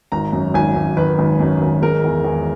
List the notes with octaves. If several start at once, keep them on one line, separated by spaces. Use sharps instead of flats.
G#1 A#5
F#2
G#1 G#5
G#1
D#3 B4
G#1
F#2
G#1
G#3 A#4
E2
E2